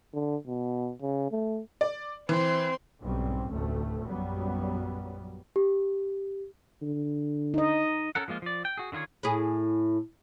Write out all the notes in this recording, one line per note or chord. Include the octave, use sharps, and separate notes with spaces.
D3
B2
C#3
A3
D5
E3 C4 C6
B1 G#2 G3 C4 C#4
F1 D2 A2 A3
A#1 F#2 F#3 G3 B3
G4
D3
D#4 D#5
C#4 A4 A#4 F#5
F3 G#3 A#3 F4
F3 D5
G5
F#4 G#4
D3 D#3 F4 G#4 C#5
A2 E4 G#4